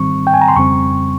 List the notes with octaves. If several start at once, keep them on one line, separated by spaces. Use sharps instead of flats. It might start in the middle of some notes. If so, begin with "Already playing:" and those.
Already playing: G#2 D#3 G3 C4 C#6
G5
G#5
A#5
C6
F2 C#3 G3 C4 C#6